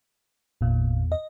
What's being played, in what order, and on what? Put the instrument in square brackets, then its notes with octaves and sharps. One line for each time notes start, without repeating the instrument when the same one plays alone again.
[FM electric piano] G#1 A#2 [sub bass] E2
[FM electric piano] D#5